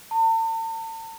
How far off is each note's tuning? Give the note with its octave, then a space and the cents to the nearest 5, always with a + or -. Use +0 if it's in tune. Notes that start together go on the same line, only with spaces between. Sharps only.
A5 +45